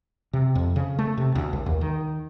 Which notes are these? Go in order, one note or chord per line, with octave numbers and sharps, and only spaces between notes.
C3
F2
C#3
A3
C3
D2
C2
D#2
D#3